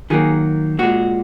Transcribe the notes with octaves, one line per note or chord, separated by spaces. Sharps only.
D#3 F#3 A#3 G#4
A#2 G#3 F#4